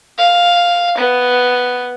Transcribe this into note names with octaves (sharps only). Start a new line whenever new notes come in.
F5
B3